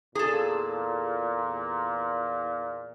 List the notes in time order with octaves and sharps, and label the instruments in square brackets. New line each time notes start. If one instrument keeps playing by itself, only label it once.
[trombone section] E2 A#2 [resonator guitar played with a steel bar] G#4 A4